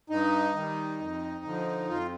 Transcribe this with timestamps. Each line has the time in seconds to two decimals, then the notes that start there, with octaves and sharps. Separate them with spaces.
0.10 G2 D#4
0.54 D#3 G3
0.99 F2
1.45 D3 F3
1.89 F2 F4